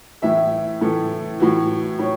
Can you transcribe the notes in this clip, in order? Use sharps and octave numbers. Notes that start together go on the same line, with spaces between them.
A2 E3 E5
A2 E3 A4
A2 E3 F#4
A2 C#5